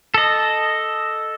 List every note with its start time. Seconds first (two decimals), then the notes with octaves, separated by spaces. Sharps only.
0.14 A4 D#5